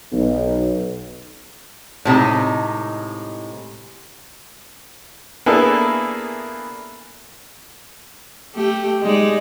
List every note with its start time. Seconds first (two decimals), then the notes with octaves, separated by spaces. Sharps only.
0.12 B1
2.05 A2 C3 G#3 D#4
5.46 A#3 B3 D4 E4 G#4 A4
8.54 A3 G4
9.02 G#3 D#4 D5